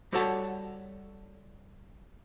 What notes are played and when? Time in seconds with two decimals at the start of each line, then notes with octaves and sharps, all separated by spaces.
0.12 G3 F#4 A4 C#5 F#5 A5